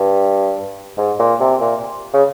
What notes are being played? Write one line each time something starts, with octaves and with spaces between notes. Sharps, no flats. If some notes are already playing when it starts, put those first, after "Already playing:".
Already playing: G2
G#2
A#2
C3
A#2
C#3